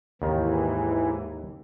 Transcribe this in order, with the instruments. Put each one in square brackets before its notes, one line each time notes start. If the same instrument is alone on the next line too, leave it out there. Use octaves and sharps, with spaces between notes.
[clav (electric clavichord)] D#2 D#3 [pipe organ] G#2 E3